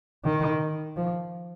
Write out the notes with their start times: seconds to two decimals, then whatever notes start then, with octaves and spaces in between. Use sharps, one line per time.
0.25 D#3
0.97 F3